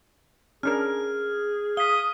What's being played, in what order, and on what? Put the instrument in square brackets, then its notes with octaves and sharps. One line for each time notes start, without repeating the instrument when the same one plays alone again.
[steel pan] C#4 D4 A#4 [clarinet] G#4 [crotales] F6
[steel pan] F5 [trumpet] D#6 [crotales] B6 G7